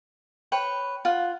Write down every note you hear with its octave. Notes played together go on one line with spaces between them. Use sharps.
B4 C#5 G5
F4 F#5